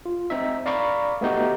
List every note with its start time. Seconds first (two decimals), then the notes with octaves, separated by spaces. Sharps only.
0.06 F4
0.30 C4 D#4 E5
0.66 D5 F5 A#5 B5 C#6 D6
1.21 A3 B3 D#4 F#4 G4